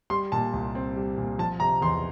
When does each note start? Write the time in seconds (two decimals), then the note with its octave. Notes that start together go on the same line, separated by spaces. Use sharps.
0.10 G3 C6
0.32 A#2 A5
0.53 C2
0.75 C4
0.96 G3
1.17 A#2
1.39 F3 A5
1.60 C3 A#5
1.81 E2 C6